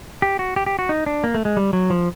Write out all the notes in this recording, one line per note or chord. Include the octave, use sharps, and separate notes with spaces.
G4
F#4
G4
G4
F#4
D#4
D4
A#3
A3
G#3
G3
F#3
F3